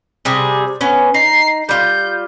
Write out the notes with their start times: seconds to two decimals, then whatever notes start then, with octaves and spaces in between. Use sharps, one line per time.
0.25 C3 G3 G#4
0.81 B3 C#4
1.14 D#4 C7
1.69 G3 F4 G6